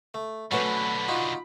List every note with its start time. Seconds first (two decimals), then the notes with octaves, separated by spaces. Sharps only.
0.14 A3
0.52 B2 D3 F#3 A3 C#4 F#4 B4 B5
1.08 D#4 F4 F#4